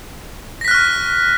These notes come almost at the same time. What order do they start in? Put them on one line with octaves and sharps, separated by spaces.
A#6 B6 F#6 F6 C#6